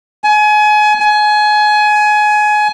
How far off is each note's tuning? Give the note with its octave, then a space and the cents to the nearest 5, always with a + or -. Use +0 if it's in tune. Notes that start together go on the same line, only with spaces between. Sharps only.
G#5 +30
G#5 +25